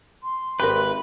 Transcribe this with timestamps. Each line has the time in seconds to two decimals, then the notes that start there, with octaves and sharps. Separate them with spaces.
0.23 C6
0.60 G#1 G4 A#4 B4